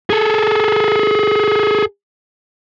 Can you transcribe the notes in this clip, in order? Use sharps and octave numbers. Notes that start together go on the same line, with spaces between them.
G#4 A4